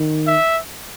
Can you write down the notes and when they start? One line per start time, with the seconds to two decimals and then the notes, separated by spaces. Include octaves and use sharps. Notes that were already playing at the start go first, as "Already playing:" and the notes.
Already playing: D#3
0.27 E5